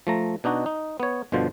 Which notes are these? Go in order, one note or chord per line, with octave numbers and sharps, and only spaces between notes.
F3 A3 A#5
B2 D4 D#4 F#4
D#4
B3 C#5
G1 B2 D3 F3 C5